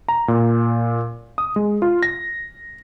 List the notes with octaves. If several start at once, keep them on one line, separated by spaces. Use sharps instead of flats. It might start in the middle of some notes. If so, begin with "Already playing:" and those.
A#5
A#2
D#6
G#3
F4
A#6